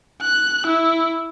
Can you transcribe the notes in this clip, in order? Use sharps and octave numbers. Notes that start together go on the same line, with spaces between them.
F#6
E4